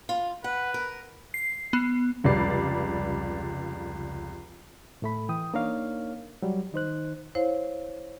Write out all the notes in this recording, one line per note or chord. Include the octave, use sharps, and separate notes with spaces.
F4
B4 F#5
A#4
C7
B3
F1 C#2 C#3 G3 D5 C7
A2 A3 B5
E3 G5 D#6
A#3 D4 D#4 A#4 C#5 F5
F#3 G3
D#3 D#4 C5 F#6
E4 C5 C#5 F5